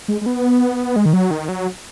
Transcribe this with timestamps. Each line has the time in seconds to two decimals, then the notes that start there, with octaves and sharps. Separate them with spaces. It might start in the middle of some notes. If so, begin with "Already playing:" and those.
0.08 G#3
0.21 G#3
0.26 B3
0.96 G#3
1.06 D#3
1.13 F#3
1.31 D#3
1.48 F#3